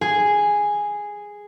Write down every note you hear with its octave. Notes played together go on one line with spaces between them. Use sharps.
G#4